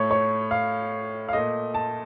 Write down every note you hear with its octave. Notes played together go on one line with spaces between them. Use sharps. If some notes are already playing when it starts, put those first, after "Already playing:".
Already playing: A2 A3 C#5
C#5
F5
F5
A#2 A3 D#5
A5